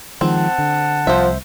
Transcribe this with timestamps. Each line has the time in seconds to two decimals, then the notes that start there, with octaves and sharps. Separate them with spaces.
0.21 D#3 F3 G#3 C4 F#5 A5
0.58 D3
1.07 C2 F3 C5 E5